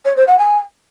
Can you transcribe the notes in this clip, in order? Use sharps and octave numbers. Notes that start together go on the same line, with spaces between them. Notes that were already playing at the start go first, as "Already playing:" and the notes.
C#5
C5
F#5
G#5